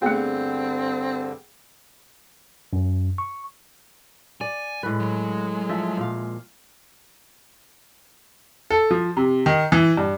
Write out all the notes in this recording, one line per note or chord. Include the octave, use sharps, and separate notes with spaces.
G2 D3 A3 B3 C4 G#4 G5
F#2
C#6
D5 G#5
A2 G#3 B4
F#3
F3 E5
A#2 F5
A4
F3
C3
D#3
E3
G2